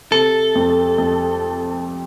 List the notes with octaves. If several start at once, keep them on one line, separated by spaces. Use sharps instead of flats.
C3 A4
F2
F2